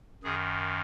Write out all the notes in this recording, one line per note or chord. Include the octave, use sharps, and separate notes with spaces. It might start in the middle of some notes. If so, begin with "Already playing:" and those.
F#2 D#3 G#4